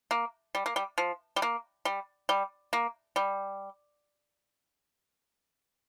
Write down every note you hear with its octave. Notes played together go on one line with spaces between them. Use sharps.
A#3
G3
A#3
G3
F3
G3
A#3
G3
G3
A#3
G3